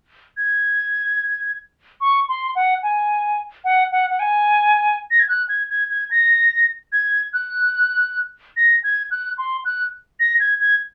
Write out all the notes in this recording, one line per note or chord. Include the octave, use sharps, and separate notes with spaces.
G#6
C#6
C6
F#5
G#5
F#5
F#5
F#5
G#5
A#6
G#6
F#6
G#6
G#6
G#6
A#6
G#6
F#6
A#6
G#6
F#6
C6
F#6
A#6
G#6
G#6